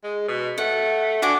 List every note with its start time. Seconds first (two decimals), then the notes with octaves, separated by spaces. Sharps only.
0.03 G#3
0.28 B2
0.58 A3 F#5
1.22 D4 F#4 G#5 D6